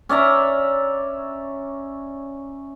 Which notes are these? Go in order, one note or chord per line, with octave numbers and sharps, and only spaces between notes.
C#4 D5 E5 A#5